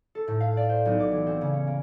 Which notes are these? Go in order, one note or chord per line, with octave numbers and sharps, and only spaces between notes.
A4
A2
F5
D5
C5
B1
D6
E3
C4
C#3
C#4
A#3